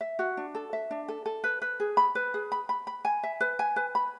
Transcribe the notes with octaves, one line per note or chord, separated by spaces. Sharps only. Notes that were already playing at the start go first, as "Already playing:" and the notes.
E5
F#4
D4
A4
E5
D4
A4
A4
B4
B4
G#4
B5
B4
G#4
B5
B5
B5
G#5
E5
B4
G#5
B4
B5